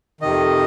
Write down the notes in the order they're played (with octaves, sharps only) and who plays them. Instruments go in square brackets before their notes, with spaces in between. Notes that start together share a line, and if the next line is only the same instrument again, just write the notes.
[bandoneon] F2 C3 D#3 D#5